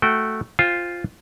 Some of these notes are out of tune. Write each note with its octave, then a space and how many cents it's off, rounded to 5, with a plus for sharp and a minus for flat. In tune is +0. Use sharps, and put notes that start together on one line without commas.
A3 +0 F#4 +0 G5 -10
F4 +0 C5 +0 G5 +40